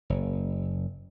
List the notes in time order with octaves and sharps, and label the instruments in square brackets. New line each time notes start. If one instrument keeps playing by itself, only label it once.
[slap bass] F#1